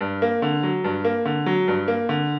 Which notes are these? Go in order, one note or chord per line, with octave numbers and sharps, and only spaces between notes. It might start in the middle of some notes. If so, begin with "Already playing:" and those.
G2
A#3
D3
F#3
G2
A#3
D3
F#3
G2
A#3
D3